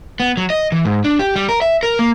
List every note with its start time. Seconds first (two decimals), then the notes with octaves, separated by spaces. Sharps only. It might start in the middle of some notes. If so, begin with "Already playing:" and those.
0.20 B3
0.37 F#3
0.50 D#5
0.72 E3
0.85 G#2
1.04 D4
1.19 G4
1.36 G3
1.49 A#4
1.62 E5
1.83 A#4
1.99 A#3